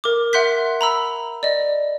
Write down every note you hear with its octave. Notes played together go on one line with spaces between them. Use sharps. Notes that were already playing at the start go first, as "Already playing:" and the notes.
A#4 D6
E5 F#5 C6 F#6 G6 B6
A#5 B5 E6
D5 D#5